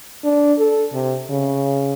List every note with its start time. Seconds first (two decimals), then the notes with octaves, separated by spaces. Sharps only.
0.24 D4
0.58 A4
0.94 C3
1.30 C#3